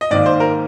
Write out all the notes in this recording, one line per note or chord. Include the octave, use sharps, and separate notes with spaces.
D#5
G#2 D#3 A#3 D5
C5
A#4